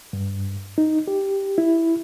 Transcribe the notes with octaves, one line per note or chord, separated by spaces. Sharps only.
G2
D#4
G4
E4